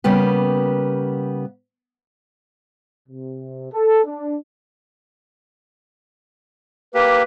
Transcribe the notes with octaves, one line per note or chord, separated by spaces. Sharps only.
C#3 G3 A#3 B3 G4
C3
A4
D4
A#3 G4 B4